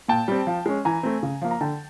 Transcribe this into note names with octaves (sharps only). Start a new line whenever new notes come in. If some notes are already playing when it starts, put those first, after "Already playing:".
A#2 G5 A5
G3 C4
F3
G#3 C#4
E3 G#5 A#5
A3 C4
C#3
F3 A#3
A#5
D3 G5 A5